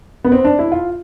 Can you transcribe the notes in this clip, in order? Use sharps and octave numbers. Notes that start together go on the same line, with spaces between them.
B3
C4
D4
E4
F4